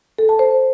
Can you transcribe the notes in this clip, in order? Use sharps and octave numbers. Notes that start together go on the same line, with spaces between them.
A4
A5
C5